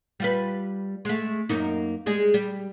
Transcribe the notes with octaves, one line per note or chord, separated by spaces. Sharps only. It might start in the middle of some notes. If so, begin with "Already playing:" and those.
G3 F4 B4
G#3 A3
F#2 A#3 D#4
G3 G#3 G#4
G3